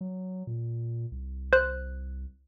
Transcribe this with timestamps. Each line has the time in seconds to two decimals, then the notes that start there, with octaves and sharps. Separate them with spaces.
0.01 F#3
0.47 A#2
1.12 C2
1.53 C5 F#6